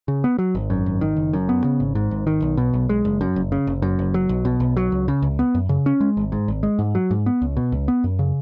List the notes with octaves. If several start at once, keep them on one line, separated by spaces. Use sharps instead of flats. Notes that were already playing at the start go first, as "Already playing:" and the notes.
C#3
B3
F#3
G#1
F#2
G#1
D#3
F#1
F#2
B3
C#3
G#1
G#2
G#1
D#3
B1
B2
B1
G#3
F#1
F#2
F#1
C#3
F#1
F#2
F#1
F#3
B1
B2
B1
F#3
C#2
C#3
C#2
B3
F#2
C#3
C#4
G#3
G#1
G#2
G#1
G#3
G#2
F#3
G#2
B3
C#2
B2
C#2
B3
F#2
C#3